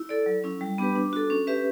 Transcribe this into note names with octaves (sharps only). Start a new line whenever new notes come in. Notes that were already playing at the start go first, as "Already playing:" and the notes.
Already playing: E4
A4 D5
F#3
C#4 E4
G3
B3 D4 G4 B4
D4
F#4 A4
C#4
G4 B4 E5